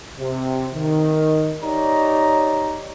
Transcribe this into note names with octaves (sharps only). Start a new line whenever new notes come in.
C3
D#3
D#4 G4 C#5 D5 A#5